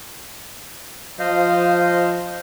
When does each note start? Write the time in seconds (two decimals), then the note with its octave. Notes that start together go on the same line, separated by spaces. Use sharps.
1.19 F3 C5 D#5 F5